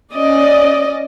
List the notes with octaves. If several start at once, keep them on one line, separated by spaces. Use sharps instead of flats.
C#4 D5 D#5